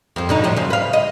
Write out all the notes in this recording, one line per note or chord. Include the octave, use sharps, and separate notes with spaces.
F2 C4
B2 D3 D#4
A2 F3 F#3
C#3 C5
B4 F5
D#5